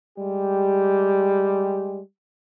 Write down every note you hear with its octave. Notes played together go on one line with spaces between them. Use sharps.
G3 G#3 G4